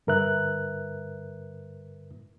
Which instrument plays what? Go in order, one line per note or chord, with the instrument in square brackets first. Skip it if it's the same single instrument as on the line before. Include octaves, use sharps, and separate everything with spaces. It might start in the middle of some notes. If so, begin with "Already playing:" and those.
[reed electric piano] G2 D3 A#4 B4 E5 F#6